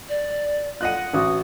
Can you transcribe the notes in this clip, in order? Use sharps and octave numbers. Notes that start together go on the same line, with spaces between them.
D5
F4 D#5 F#5 F#6 D#7
A1 F#4 D#6